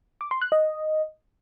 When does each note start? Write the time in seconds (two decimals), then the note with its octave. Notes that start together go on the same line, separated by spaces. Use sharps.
0.21 D6
0.31 C6
0.42 F#6
0.52 D#5